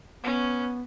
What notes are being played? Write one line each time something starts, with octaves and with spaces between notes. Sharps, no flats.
B3 C#4